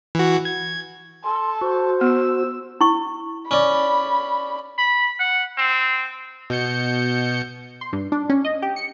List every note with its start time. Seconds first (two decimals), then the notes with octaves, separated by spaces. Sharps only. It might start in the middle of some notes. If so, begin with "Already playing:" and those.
0.15 E3 F#4
0.45 G#6
1.24 A4 C6
1.61 F#4 C5
2.01 B3 E6
2.81 E4 C#6
3.51 C#4 D5 B5
4.78 B5
5.19 F#5
5.57 C4
6.50 B2 G6 C#7
7.81 C6
7.93 G2
8.12 D4
8.29 C#4
8.45 D#5
8.62 G4
8.76 C#7